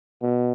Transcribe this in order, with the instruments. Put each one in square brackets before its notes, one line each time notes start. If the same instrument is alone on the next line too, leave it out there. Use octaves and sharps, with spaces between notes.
[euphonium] B2